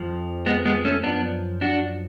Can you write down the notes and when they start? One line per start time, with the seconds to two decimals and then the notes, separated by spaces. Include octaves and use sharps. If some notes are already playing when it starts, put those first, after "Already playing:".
Already playing: F2 F3
0.46 G#3 B3
0.65 G#3 B3
0.85 A3 C#4
1.03 F#2 F3 B3 D4
1.61 D4 F#4